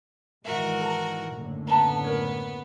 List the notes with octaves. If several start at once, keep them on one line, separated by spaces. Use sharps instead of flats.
G#2 D#3 E3 F#4 A#4 E5
A4 A#5
F#1 A2 D3
B3 A5 A#5
A#4 C#5